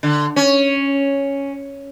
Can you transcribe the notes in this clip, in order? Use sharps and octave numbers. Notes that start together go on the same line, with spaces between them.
D3
C#4